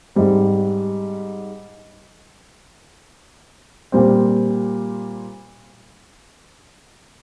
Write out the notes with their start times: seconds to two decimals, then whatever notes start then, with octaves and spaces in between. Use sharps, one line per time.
0.15 G#2 G3 C4
3.92 A#2 G3 C4